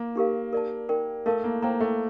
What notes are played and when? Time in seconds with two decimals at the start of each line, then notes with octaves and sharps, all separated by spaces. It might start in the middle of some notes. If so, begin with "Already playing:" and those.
Already playing: A#3
0.16 D#4 G4 A#4 F5
0.53 A#4 D5 A5
0.89 D#4 A#4 D5 G5
1.26 A3 A#4 F5 A5
1.44 A#3
1.62 A#3 C5 G5 A#5
1.80 A3